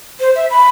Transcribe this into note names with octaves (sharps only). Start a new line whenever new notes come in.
C5
E5
B5